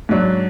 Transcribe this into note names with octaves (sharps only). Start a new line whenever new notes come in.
G#2 F#3 D4